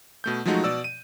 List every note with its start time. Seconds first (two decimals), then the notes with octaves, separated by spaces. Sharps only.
0.24 B2 A3 G6
0.46 F3 F#3 G#3 A3 D#4 F#4
0.64 B2 D5 E6
0.84 D#7